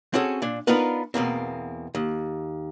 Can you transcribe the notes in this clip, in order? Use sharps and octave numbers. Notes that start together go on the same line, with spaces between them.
C4 C#4 F#4 G#4 A4
A#2 D4
B3 D4 D#4 F4 A#4 B4
E2 B2 A#3 C4
D#2